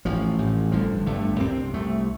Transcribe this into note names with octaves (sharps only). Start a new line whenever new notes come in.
A1 A2 F3
A1 A2
G1 G2 D3 F3
G1 G2 D3 A3
C2 C3 C4
C2 C3 A3